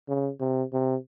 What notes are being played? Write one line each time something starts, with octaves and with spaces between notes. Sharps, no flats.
C#3
C3
C3